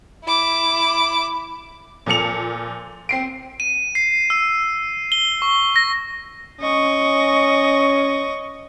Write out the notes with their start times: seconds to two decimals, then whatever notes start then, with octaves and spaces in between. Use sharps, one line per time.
0.24 E4 D6
2.06 A#2 F3 A4 C#7 F7
3.09 C4 C7 D7
3.60 D#7
3.95 C7
4.30 E6
5.12 G7
5.42 C#6
5.76 A#6
6.60 C#4 D#5 C#6